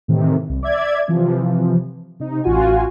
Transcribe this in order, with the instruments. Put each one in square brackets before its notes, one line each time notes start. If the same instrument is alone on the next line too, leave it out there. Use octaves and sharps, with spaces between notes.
[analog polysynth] A2 C3 D#3 E3
C2
D5 E5 G#6
C3 E3 F3
C3 D#4
A1 F4 F#4 G#5